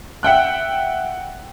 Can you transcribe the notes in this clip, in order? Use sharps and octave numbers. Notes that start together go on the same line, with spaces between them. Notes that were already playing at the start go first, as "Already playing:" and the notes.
E5 F#5 G5 F#6